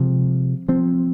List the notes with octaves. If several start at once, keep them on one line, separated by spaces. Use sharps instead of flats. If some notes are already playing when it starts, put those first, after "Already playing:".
Already playing: C3 F3 G#3
F3 C4